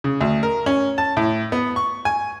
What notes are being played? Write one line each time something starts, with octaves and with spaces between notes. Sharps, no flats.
C#3
D2
A#4
C#4
A5
A2
B3
C#6
G#5